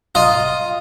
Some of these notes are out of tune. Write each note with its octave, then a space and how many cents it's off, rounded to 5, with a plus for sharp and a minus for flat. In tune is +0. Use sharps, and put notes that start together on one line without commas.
F4 +0 D#5 +0 A#5 +0